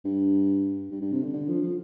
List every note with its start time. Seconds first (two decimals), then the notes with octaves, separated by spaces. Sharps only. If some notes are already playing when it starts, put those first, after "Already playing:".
0.05 G2
0.91 G2
1.01 G2
1.12 C3
1.23 D3
1.33 D3
1.48 F3
1.62 F3